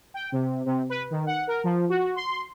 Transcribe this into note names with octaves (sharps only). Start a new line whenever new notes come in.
G5
C3
C3
B4
D#3
F#5
A#4
F3
F#4
C6